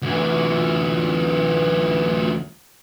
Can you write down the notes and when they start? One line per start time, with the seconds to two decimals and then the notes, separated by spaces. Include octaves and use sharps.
0.02 D2 E3